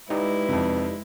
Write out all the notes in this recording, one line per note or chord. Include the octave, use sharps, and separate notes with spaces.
G#3 D#4 E4 G4 B4 D5
F2 C3